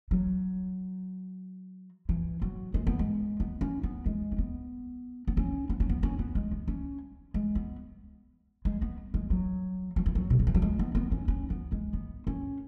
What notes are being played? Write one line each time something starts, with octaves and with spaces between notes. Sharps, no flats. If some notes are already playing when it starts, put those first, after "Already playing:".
F#3
E3
F#3
G#3
B3
G#3
B3
C#4
B3
G#3
C#4
B3
B3
C#4
B3
C#4
B3
C#4
B3
G#3
B3
C#4
G#3
B3
G#3
B3
G#3
F#3
F#3
E3
F#3
B2
C#3
E3
F#3
G#3
B3
B3
C#4
C#4
B3
G#3
B3
C#4